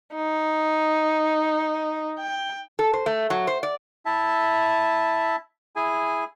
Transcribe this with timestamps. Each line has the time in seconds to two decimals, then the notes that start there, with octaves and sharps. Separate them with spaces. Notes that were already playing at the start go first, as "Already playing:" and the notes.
0.15 D#4
2.20 G5
2.79 A4
2.94 C5
3.06 A3
3.30 F#3
3.47 C5
3.63 D5
4.06 E4 E5 A5
5.76 E4 G#4 G#5